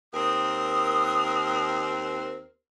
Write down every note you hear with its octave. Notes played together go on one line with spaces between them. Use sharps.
D#2 C4 A#4 D#6